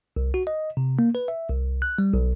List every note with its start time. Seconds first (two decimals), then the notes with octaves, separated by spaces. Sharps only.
0.16 C2
0.34 F#4
0.47 D#5
0.77 C3
0.99 A#3
1.15 B4
1.28 E5
1.49 C2
1.82 F#6
1.98 G3
2.14 B1